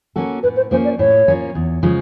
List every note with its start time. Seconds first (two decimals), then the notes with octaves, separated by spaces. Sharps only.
0.16 A#3 C#4 F#4 A4
0.43 A2 B4
0.57 C5
0.71 F3 A#3 C#4 C5
0.85 D5
0.99 A2 C#5
1.28 F3 A#3 C#4
1.55 E2
1.83 C#3 F3 G#3